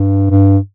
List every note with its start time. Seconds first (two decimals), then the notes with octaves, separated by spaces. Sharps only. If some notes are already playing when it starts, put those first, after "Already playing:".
Already playing: G2
0.30 G2